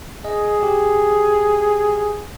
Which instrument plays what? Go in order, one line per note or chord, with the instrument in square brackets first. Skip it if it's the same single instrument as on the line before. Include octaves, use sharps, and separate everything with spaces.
[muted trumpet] G#4 [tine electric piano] D#5
[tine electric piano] G4